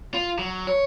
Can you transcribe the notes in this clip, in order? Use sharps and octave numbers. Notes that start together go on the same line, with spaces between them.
F4
F#3
C#5